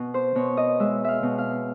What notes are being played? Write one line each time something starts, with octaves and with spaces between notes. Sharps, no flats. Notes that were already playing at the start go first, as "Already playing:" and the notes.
Already playing: B2
C5
B2 C#5
D#5
G#3 E5
E5 F5
B2
F5